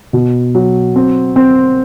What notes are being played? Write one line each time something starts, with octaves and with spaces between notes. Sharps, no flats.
B2
F#3
C4
C4